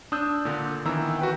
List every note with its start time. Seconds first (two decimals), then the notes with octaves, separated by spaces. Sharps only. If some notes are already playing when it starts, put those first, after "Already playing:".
0.12 D4 D#6 E6 G6
0.45 A#2 D3
0.85 D#3 E3 B3 A#5 E6
1.19 F#4 B4 G5